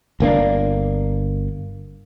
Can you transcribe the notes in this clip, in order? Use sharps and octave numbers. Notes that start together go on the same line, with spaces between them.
G1 A#3 C4 D4